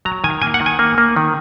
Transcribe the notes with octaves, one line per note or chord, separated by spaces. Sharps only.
F#3 A#5
D#3 G#5
A#3 G#5
F#5
D#3
G#5
A#3
A#3
D#3